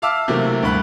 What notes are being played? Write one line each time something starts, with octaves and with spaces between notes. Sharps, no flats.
E5 F5 A5 D6 E6 F6
C3 E3 F#3 A3 A#3 C4
D2 G2 B5 F#6